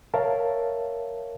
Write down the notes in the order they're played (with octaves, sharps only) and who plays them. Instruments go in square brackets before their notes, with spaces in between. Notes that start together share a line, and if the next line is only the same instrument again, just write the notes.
[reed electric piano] A#4 C#5 E5 F5 A5